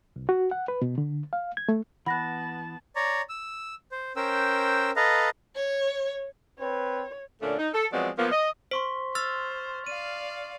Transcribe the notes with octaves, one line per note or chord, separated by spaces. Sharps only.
C2
F#4
F#5
B4
B2
D3
F5
G#6
A3
E3 B3 F#5 A5 B5 F#6 A#6
C#5 D5 A#5
E6
C5
C#4 A#4 C5 G5 E6
A4 B4 D#5 F5 A#5
C#5
C4 B4 C#5
A#2 D3 A3 C#4 D4
D#4
A4
F3 F#3 G#3 B3 C4 D5
F3 A#3 B3
D#5
C5 C6 C#6 B6
C5 E6 F6 A6 F7
D5 F5 D#7